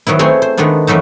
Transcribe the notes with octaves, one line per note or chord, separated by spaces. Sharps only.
D#3 F#3 B3 E4
A3 C4 G#4 C#5 G5 G#5
C5
D#3 G#3 A3 B3 D4
F#2 E3 F#3 A3 D#4